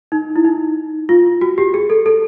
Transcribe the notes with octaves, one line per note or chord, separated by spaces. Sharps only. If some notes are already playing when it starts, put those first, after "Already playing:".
D#4
E4
D#4
F4
F#4
G4
G#4
A4
A4